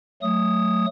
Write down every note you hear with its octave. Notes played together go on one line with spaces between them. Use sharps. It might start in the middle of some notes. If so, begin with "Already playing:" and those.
F#3 A3 D#6